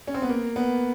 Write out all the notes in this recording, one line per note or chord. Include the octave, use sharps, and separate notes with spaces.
C#4
C4
B3
A#3
B3